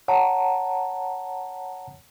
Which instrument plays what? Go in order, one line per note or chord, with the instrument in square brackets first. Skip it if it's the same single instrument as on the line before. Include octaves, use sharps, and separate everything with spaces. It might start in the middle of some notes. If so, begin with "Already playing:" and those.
[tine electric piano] C#5 F#5 A5 A#5